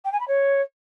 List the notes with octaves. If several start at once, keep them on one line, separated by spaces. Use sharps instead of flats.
G5
G#5
B5
C#5